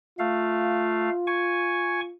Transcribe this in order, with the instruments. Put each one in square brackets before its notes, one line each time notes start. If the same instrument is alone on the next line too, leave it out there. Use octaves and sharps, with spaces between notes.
[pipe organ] A3 F5 [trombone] F4
[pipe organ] G#5 C#6